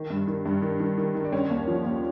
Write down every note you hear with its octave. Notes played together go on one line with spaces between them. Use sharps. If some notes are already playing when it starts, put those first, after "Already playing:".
Already playing: D#3
G2
D#3
G2
D#3
D#3
D#3
D#3
D4
D3 C#4
D#2
F3
D#2